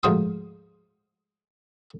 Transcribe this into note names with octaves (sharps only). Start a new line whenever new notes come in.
D2 G#2 F3 F#4 C6 D#6